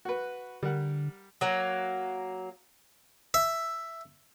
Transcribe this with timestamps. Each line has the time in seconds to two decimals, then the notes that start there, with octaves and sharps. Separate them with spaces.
0.05 F#4 B4
0.63 D3 G3 A#4 F#5
1.41 F#3 A#3
3.34 E5